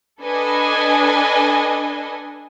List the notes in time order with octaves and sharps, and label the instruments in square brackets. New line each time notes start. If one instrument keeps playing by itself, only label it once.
[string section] D4 A4 B4 D#5 G#5